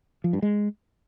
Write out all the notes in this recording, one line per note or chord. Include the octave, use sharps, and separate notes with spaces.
F3
G2
G#3